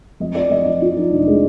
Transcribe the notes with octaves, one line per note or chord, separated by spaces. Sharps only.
F2 D#5
F3 D5
F2 D#5
F3
F3 F4
F3 D#4
F1 D4
G#3